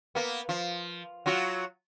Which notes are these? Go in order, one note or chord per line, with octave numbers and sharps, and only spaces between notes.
A#3 B3
F3
F#3 F4 F#4